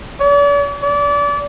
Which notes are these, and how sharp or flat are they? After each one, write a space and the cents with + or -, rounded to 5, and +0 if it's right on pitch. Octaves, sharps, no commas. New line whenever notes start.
D5 -45
D5 -30